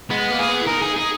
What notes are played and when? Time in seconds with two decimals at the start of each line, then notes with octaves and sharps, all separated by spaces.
0.11 G#3 B3
0.30 A#3
0.39 G#4
0.48 B3
0.61 E4
0.67 D#4 A#4
0.82 G#4
0.97 G#4